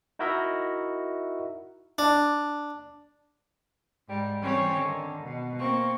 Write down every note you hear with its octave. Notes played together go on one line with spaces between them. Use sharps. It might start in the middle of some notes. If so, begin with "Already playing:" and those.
D#4 E4 F#4 A#4 D#5 E5
D4
G#2 G3
E3 G3 C4 C#4 G4 C#5
D3 D#3
B2
A#3 C4 C#6